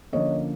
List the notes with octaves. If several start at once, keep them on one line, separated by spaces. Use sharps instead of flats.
D3 F3 A#3 C#4 C#5 D#5